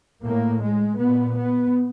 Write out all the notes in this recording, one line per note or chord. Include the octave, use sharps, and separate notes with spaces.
A2 A#3
G#3
A#2 B3
B3